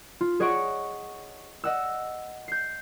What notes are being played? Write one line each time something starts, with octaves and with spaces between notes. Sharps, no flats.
F4
G#4 C#5 D#5 F#5 C#6 D7
D#5 F#5 E6
G6 C7